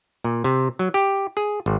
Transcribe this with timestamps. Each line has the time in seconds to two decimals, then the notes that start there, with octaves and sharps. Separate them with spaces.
0.24 A#2
0.44 C3
0.79 F#3
0.94 G4
1.37 G#4
1.66 G#1